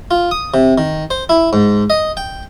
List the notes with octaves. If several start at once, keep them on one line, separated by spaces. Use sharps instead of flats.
F4
D#6
C3
D#3
C5
E4
G#2
D#5
G5